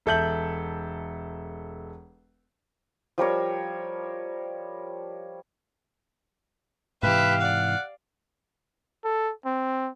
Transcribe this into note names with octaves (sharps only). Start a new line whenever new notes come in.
E1 A4 E5 G6 F#7
F3 G3 A#4 C#5
G#2 C3 E3 G4 B4 E5 F5
D5 F#5
A4
C4